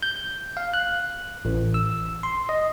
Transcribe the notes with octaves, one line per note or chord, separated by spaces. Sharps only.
G6
F5
F#6
A1
E6
C6
D#5